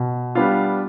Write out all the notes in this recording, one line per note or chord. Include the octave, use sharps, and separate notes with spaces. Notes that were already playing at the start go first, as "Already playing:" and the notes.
Already playing: B2
G3 B3 D4 F4